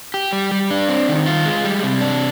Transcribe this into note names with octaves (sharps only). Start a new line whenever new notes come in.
G4
G3
G3
D4
C4
D#3
F4
G#3
G3
C3
D4